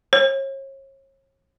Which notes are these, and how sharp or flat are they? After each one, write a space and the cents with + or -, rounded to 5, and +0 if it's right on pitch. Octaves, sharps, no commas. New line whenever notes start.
C#5 -35